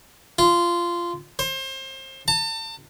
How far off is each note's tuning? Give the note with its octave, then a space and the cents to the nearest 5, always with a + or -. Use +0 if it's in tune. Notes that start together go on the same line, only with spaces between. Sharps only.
F4 -15
C5 +30
A5 +35